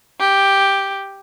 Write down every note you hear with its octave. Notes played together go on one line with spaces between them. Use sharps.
G4